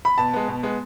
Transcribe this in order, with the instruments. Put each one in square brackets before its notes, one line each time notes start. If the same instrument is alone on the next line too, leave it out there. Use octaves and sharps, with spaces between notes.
[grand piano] B5
[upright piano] B2 [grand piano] A5
[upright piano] G#3 B3
B2
G#3 B3